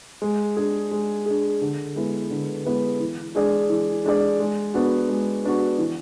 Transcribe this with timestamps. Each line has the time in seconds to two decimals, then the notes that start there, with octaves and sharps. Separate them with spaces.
0.22 G#3
0.57 D4 G#4
0.91 G#3
1.26 D4 G#4
1.61 D3
1.95 G#3 B3 E4 B4
2.31 D3
2.65 G#3 B3 E4 B4
3.00 E3
3.35 G#3 D4 G#4 D5
3.70 E3
4.04 G#3 D4 G#4 D5
4.39 G#3
4.74 B3 D4 F#4
5.09 G#3
5.44 B3 D4 F#4
5.78 E3